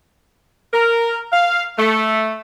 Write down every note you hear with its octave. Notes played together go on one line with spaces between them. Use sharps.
A#4
F5
A3